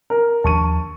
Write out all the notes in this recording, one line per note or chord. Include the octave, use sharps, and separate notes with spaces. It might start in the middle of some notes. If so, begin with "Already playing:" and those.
A#4
D#2 F3 D4 A5 C#6 D#7